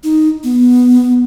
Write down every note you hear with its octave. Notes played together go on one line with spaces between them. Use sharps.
D#4
B3